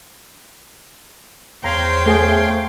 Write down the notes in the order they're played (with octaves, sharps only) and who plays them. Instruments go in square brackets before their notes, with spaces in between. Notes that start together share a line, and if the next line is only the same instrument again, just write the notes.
[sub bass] E2 [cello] C5 G5 [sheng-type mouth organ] C#5 F5 C6 [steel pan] A#5
[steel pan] A3 G#4